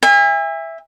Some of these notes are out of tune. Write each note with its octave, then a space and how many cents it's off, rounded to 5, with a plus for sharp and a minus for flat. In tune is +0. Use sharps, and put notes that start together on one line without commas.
E5 +0 G#5 -40